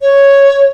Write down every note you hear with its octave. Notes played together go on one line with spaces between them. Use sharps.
C#5